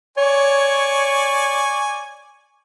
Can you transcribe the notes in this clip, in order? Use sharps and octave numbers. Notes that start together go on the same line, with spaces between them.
C#5 D5 G#5 C#6